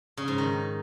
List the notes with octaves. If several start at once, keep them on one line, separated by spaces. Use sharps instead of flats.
C#3
G#2
D#3